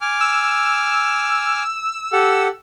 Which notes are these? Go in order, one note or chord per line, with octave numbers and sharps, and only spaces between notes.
G#5 D6 F6
E6
G4 A4 F#5